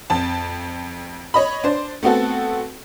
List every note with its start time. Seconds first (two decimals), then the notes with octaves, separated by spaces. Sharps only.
0.10 F2 A5
1.34 C#5 D#5 B5
1.64 D4 C5
2.03 A3 B3 C4 F#4 A4